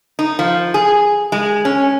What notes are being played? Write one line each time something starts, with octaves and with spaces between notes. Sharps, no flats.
D#4
F3
G#4
G#3
C#4